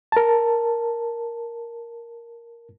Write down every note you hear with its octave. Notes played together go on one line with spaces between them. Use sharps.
A#4 A5